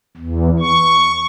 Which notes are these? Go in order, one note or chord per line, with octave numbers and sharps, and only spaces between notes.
E2
C#6